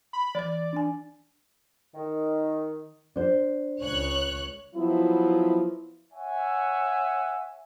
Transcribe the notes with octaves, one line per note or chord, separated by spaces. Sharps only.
B5
E3 D5 A6
D4 G#5
D#3
D4 C5
C#2 C#5 F#6
F3 F#3 B3 E4
C#5 E5 F#5 G#5